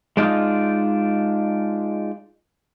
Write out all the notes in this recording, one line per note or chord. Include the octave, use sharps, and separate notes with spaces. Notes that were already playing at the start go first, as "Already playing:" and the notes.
G#3 D4 D#4 F4